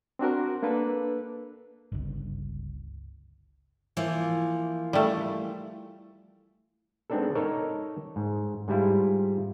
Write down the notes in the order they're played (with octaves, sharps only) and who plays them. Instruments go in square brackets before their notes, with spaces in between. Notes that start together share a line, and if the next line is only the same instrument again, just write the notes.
[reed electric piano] C4 D4 F#4 A#4
A#3 D4 A4 B4
[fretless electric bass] G1 C#2
[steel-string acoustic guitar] E3 F3 A#3
[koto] G3 A3
[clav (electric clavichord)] G#3 B3 C4 D4 D#4 A4
D#4 A4 A#4 C#5 D5
G#2
G#2 G3 E4 F4